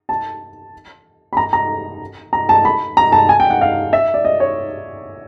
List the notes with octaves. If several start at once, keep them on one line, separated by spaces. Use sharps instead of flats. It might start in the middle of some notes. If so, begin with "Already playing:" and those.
A5
B5
A#5
A#5
A#5
A5
B5
A#5
A5
G#5
G5
F#5
F5
E5
D5
D#5
C#5